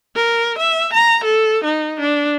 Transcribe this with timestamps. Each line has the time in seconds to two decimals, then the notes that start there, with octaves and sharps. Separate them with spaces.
0.16 A#4
0.58 E5
0.93 A#5
1.24 A4
1.64 D#4
2.00 D4